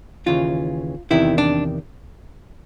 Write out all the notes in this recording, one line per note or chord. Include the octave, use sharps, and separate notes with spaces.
D#2 C#3 E3 F4
E2 C3 D#3 E4
D4